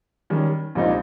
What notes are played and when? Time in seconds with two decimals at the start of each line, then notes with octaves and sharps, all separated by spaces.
0.30 D#3 G3 C#4
0.75 A#1 A#2 G3 C4 D#4